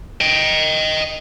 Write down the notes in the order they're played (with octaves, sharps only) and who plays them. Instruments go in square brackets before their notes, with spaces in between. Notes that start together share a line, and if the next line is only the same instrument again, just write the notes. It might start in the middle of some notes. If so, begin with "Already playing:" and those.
[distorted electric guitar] D#5 G5